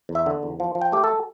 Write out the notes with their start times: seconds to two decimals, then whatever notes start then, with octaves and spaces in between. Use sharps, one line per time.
0.09 E2
0.15 E5
0.26 D3
0.43 E2
0.60 F3
0.75 F3
0.81 G5
0.92 A3 G4
1.04 A4